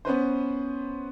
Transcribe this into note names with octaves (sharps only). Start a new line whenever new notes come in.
B3 C#4 B4 C5